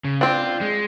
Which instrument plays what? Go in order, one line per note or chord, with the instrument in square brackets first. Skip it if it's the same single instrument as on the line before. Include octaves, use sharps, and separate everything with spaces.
[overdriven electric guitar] C#3
[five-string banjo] C4 D4 [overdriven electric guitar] F4
[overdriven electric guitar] G#3